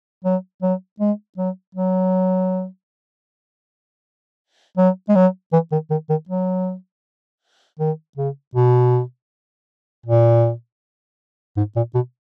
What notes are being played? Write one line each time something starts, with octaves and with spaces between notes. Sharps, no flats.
F#3
F#3
G#3
F#3
F#3
F#3
G#3
F#3
E3
D#3
D#3
D#3
F#3
D#3
C#3
B2
A#2
G#2
A#2
B2